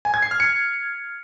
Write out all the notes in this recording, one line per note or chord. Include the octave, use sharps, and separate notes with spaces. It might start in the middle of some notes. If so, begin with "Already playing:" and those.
G#5
G#6
C7
F6
C#7